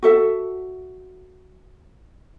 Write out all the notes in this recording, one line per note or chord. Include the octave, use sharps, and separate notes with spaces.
F#4 A4 E5